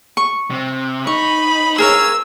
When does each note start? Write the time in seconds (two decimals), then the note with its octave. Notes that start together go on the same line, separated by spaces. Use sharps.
0.17 C#6
0.51 C3
1.07 D#4 B5 C#6
1.78 G#4 A#4 C#5 E6